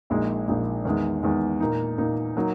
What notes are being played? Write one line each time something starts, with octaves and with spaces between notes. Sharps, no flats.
A#1 A#2 G#3 D#4
A#1 A#2 G#3 D#4
E2 D#3 G#3
E2 D#3 G#3
A#2 A#3 D#4
A#2 A#3 D#4
F#3 A#3 D#4